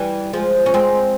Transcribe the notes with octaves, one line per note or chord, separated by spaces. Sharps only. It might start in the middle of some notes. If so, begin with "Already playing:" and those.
Already playing: E3 G3
F3 G#3
C#4
G#3 C4